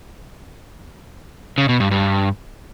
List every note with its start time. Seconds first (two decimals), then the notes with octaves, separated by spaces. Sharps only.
1.58 C#3
1.69 B2
1.80 G2
1.91 G2